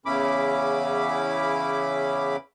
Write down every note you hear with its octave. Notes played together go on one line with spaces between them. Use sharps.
E2 C#3 C#4 E4 B5 D6